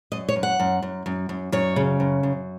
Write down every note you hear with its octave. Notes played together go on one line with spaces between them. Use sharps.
F#2 D#5
C#5
F#2
F#5
F#2
F#2
F#2
F#2
F#2 C#5
C#3
F#2
F#2